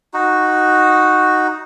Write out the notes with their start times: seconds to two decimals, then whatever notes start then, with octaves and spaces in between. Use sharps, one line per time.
0.14 D#4 F#4